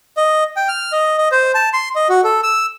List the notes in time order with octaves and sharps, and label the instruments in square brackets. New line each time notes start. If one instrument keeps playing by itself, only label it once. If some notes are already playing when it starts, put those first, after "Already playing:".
[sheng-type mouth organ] D#5
G5
F6
D#5
D#5
C5
A5
C6
D#5
F#4
A4
E6